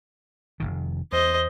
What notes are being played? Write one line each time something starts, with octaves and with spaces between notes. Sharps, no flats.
F1 C2 D#3
E2 C5 D#5